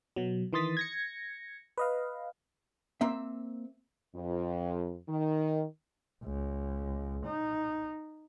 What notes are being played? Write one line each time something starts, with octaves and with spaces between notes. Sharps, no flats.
B2 F#3
D#3 E3 C6 D#6 A6 B6
G#6 A#6 C#7
B4 D#5 F5
A#3 C4 E5
F2
D#3
C#2
D#4